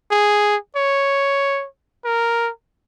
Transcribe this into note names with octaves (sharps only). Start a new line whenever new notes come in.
G#4
C#5
A#4